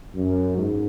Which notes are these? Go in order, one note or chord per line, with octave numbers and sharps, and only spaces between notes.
F#2
G#2